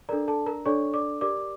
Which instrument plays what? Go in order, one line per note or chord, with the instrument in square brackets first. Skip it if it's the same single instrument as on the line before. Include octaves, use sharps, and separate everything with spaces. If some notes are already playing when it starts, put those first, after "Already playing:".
[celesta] D4 A4 A#4 D5 A#5
A4 A5
A#4 A#5
D4 A4 C#5 D5 C#6
D5 D6
G4 A#4 D5 D6